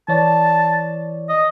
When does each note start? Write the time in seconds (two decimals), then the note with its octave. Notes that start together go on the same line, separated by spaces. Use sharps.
0.08 E3 C#5 D5 A5
1.29 D#5